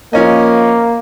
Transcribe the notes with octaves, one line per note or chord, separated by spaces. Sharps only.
F3 A#3 C#4 D#5